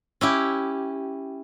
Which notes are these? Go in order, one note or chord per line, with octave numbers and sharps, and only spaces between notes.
C#4 E4 G4